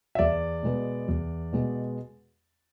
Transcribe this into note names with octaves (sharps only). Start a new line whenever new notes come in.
E5
E2 D5
B2 G#3 B3
E2
B2 G#3 B3